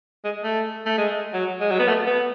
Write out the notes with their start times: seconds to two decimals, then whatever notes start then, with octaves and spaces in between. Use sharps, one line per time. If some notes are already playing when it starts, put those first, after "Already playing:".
0.25 G#3
0.44 A3
0.86 A3
0.98 G#3
1.34 F#3
1.61 G#3
1.71 F#3
1.80 B3
1.88 A3
2.07 B3